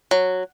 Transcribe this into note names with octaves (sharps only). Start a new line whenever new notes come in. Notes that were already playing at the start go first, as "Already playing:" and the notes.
F#3